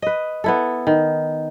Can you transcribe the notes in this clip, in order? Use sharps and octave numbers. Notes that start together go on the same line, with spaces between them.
B4 D#5
B3 E4 A4
D#3